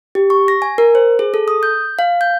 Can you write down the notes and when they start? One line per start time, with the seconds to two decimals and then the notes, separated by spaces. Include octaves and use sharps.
0.15 G4
0.30 C#6
0.48 A#6
0.62 G#5
0.78 A#4
0.95 C5
1.19 G#4
1.34 A4
1.48 D#6
1.63 G6
1.99 F5
2.21 G6